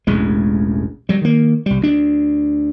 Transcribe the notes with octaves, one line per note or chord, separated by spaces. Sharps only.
E1 A1 E2 G#3
F#3 G3
D#3 A#3
C2 G3
D2 D4